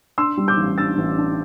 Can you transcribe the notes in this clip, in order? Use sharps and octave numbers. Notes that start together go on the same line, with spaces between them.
D4 C6 E6
G3
D6 G6
A1
D4 E6 A6
A1
D4